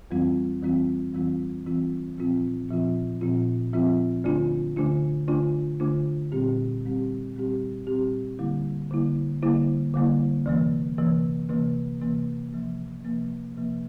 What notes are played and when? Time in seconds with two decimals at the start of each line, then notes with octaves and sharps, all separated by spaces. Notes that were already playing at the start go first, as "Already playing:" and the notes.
0.11 F2 E3 G3 C4 F4
0.62 F2 E3 G3 C4 F4
1.14 F2 E3 G3 C4 F4
1.65 F2 E3 G3 C4 F4
2.17 A#2 F3 C4 F4
2.69 A#2 F3 C4 F4
3.21 A#2 F3 C4 F4
3.73 A#2 F3 C4 F4
4.24 D2 D3 A3 D4 F4
4.76 D2 D3 A3 D4 F4
5.28 D2 D3 A3 D4 F4
5.80 D2 D3 A3 D4 F4
6.32 A#2 G3 C4 G4
6.84 A#2 G3 C4 G4
7.35 A#2 G3 C4 G4
7.87 A#2 G3 C4 G4
8.39 D3 G3 A#3 E4
8.91 D3 G3 A#3 E4
9.43 D3 G3 A#3 E4
9.94 D3 G3 A#3 E4
10.46 D2 C3 E3 A#3
10.98 D2 C3 E3 A#3
11.49 D2 C3 E3 A#3
12.01 D2 C3 E3 A#3
12.53 C3 F3 A#3
13.05 C3 F3 A#3
13.56 C3 F3 A#3